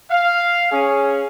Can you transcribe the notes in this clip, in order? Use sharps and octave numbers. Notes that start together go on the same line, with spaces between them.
F5
C#4 G#4